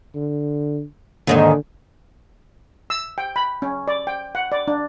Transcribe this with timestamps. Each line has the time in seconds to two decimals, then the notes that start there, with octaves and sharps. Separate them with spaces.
0.15 D3
1.27 D#2 G#2 D3 D#3
2.90 E6
3.18 G5
3.36 B5
3.62 C#4
3.88 D5
4.07 G5
4.35 F#5
4.52 D5
4.68 D4